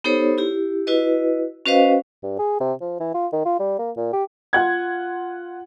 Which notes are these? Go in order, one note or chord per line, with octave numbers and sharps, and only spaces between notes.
B3 D#4 G4 A4 C5 C#5
E4 G4
E4 F#4 B4 D#5
C#4 F#4 B4 C5 D#5 F5
G2
G#4
C3
F3
E3
F4
D#3
F4
G3
A#3
A#2
G4
F4 F#5 G#6